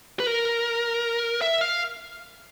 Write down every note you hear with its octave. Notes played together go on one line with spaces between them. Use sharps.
B4
A#4
E5
F5